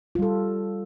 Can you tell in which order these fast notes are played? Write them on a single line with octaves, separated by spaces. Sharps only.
F4 G3 A4